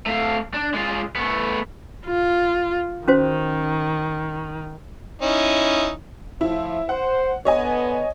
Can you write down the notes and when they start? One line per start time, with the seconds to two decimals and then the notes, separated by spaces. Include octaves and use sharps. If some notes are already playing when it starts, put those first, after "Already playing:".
0.07 A3 F5
0.54 D4
0.74 G#3 F4
1.15 A3 B3
2.06 F4
3.08 D#3 C#4 F#4 C5
5.22 C#4 D#4 E4
6.41 A2 F3 E4
6.89 C5 F#5
7.45 D3 B3 C#5 D#5 G#5